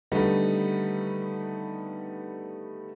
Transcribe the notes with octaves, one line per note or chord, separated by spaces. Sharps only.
D3 D#3 G3 A3 B3 D#4